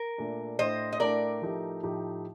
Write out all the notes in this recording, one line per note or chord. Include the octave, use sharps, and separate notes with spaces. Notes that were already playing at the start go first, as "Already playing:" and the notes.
Already playing: A#4
A#2 A3 D4
A2 A3 D4 C5 D#5
D#5
A2 A3 D4 A#4 D5
A2 F3 A3 D#4 G4
A2 F3 A3 D#4 G4